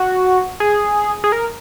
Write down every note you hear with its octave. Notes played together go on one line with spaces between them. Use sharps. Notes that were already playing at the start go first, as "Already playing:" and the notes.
Already playing: F#4
G#4
G#4
A#4